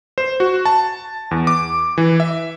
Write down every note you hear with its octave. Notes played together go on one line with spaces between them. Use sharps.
C5
F#4
A5
E2
D6
E3
E5